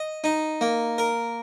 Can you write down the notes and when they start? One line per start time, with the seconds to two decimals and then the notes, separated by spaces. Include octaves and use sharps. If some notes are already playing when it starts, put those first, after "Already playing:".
Already playing: D#5
0.24 D#4
0.61 A#3
0.98 A#4